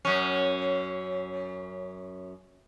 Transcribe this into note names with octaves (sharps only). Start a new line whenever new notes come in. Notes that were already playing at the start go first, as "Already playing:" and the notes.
F#2 C#4